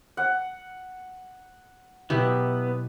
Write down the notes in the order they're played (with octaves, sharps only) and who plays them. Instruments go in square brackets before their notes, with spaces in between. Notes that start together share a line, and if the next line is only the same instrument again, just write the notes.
[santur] F#5
[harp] B2 E5 G6 [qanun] F#3 E4 G4 [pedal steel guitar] B3